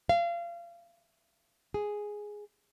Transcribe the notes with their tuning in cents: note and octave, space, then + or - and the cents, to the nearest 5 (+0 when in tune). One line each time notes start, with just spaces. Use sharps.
F5 -30
G#4 +0